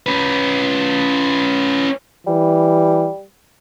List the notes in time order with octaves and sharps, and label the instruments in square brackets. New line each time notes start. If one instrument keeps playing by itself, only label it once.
[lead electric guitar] C#4 B4
[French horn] E3 [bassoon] G3